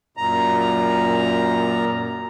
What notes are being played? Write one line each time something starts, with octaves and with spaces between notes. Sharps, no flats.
F#2 A#2 A#5